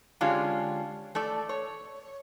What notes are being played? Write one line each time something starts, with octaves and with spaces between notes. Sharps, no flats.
D3 G#3 C#4 D4 F4 G4
A3 A4 D5
C#5